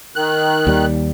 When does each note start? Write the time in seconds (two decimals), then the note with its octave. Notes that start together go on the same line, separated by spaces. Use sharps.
0.16 D#3 F#6
0.67 D#2 G3